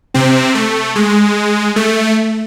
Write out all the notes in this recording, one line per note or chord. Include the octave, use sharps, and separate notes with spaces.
C3 C4
A3
G#3
A3